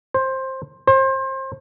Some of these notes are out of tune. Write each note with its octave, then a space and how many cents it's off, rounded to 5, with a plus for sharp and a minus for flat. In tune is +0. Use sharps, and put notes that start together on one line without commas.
C5 +15
C5 +30